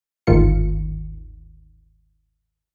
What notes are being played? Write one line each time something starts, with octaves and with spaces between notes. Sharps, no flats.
G1 D2 G#2 D#3 F4 C#7